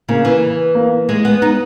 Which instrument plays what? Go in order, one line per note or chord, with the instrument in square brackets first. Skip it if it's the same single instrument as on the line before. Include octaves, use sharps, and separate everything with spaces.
[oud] C#3 [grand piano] A#3
[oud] E3
[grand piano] A#3
[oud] G#3
B3
D#4